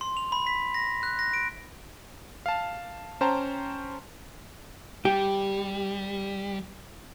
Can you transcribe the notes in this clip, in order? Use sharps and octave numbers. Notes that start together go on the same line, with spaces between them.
C6
F7
B5
B6
A#6
F#6
A#6
D7
F5 A5
C#4 C5 G5 A5 A#5
G3 G4